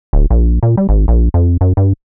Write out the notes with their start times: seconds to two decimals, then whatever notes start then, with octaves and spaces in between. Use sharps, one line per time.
0.13 D1
0.30 A#1
0.63 A#2
0.77 G3
0.89 G#1
1.08 A#1
1.34 F2
1.61 F#2
1.77 G2